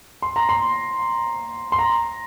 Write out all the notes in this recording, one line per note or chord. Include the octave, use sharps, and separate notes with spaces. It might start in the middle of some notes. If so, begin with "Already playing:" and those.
C6
A#5
C6
C6
A#5